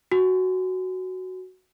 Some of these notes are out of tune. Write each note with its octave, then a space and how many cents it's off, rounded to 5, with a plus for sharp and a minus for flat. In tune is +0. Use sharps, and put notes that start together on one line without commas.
F#4 +5 G#5 +0 C6 -45